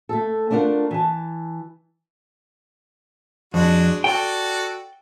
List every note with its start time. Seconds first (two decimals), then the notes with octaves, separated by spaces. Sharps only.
0.09 A3 A4
0.50 A3 D4 F4 A#4 F#5
0.91 E3 A5
3.54 F2 G#3 D4 F#4
4.04 F#4 A4 D5 G5